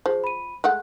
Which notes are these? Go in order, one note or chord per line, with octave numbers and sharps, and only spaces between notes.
F3 G#4 C5
B5 D#7
G#3 A3 F#5 F#6